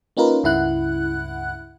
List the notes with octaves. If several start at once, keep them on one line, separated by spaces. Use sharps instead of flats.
A#3 C#4 D#4 F4 A#4 B4
C#2 G2 C#3 E4 F#5 F#6